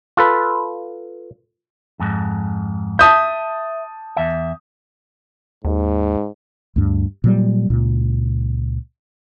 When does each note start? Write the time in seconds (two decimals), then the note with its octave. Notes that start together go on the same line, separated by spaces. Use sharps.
0.17 F4 A4 B4
2.00 F2 G#2
2.99 E5 A5 D#6 G6
4.17 E2 E5
5.64 D#2 G#2
6.76 D2 G2
7.24 A#2 F#3 G3
7.70 C#2 A#2